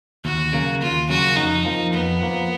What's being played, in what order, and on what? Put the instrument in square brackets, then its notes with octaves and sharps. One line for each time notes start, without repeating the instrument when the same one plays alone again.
[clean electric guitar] D#2 [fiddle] F#4
[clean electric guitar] C#3 F#3 A#3
[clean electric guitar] D#2 [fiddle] F4
[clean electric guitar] C#3 F#3 A#3 [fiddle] F#4
[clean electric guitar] F2 [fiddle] D#4
[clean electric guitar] F3 A#3
[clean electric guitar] F2 [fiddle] B3
[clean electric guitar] F3 A#3